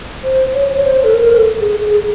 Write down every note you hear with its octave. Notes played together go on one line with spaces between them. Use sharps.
C5
C#5
C#5
C5
A4
A#4
A4
G#4
G#4